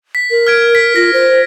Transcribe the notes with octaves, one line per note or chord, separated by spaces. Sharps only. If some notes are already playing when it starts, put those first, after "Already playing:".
B6
A#4
F6 G#6 D7
B6
F4 A#6
C5